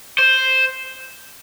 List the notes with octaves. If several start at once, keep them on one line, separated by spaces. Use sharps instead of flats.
C5